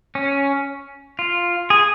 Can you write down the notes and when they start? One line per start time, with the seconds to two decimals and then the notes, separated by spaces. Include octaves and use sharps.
0.15 C#4
1.19 F4
1.70 G#4